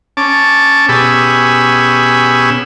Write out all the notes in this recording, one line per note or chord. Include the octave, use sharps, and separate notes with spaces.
C#4 A5 D6
B2 C#4 G4 G#4 B5 E6